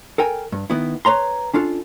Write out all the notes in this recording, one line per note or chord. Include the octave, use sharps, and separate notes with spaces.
A4 A#4 G5 G#5
G2
D#3 B3 E4
B4 C#5 A#5 C6
C#4 D4 F4 A4